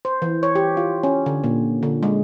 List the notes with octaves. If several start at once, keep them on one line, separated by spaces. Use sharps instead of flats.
C5
E3
C#5
G4
F4
C#4
D3
A#2
D3
G#3